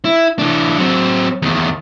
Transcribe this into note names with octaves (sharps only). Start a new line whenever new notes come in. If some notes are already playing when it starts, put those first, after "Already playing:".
E4
E3 D4
F#3 C4
E2 D#3